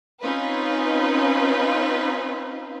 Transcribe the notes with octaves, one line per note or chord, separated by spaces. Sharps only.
C4 C#4 D#4 F4 B4